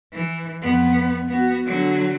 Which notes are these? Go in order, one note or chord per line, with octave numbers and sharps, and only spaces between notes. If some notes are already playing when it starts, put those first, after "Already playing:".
E3
F2 B3
B3 F#4
D3 F#3